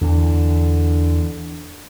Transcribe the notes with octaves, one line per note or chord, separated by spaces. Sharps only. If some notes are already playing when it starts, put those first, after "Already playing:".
E2 D3